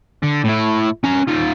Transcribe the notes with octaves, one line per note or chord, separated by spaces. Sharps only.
D3
A2 E4
C#4 A#5
D#4 F4